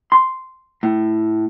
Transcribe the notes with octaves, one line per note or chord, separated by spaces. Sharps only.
C6
A2